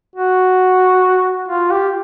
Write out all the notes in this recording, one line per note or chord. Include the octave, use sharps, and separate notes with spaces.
F#4
F4
G4